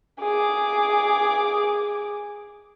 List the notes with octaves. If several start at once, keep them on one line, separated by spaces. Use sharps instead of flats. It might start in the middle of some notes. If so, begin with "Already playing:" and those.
G#4 D6